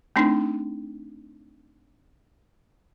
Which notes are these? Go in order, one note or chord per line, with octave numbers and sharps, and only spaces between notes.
A3 C4 D4 D#4